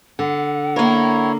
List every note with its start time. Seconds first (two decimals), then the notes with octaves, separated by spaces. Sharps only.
0.19 D3 F#5
0.76 A#3 E4 A#4 C#5